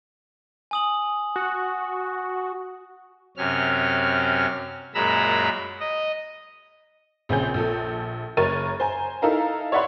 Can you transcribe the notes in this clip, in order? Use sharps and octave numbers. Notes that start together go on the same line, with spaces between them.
G#5 D#6 F#7
F#4
F#2 C3 C#4 F6
F#2 A#2 G#3 A#5 B5 E6
D#5
A#1 C#3 C4 G#5 G6
A#1 A4
F#1 A#4 C#5 A6 D#7
C5 G#5 A#5
D#4 E4 A4 A#4 F5 A#5
C#5 D5 E5 F#5 B5 C6